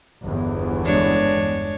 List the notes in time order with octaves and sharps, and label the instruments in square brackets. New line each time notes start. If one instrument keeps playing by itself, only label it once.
[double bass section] G1 E2
[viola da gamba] G#3 D4 C#5